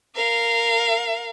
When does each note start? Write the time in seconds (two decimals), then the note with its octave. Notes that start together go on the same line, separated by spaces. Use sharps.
0.16 A#4 F5